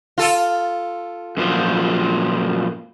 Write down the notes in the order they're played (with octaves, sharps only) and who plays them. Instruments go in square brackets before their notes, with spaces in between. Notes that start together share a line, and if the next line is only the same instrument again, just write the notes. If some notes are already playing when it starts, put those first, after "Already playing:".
[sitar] F4 A4
[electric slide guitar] F#2 A#2 F3